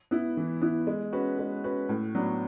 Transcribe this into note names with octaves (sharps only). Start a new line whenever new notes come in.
B3 E4
E3
B3 E4
G#3
C#4 F#4 B4
G#3
C#4 F#4 B4
A2
F#3 B3 D4